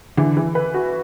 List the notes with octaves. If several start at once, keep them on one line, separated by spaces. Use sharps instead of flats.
D3 E3
E3
B4
F#4